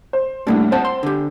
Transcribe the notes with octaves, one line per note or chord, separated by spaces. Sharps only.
C5
A2 G3 A3 A#3 D4
C4 C5 F#5 A5
C6
D3 G4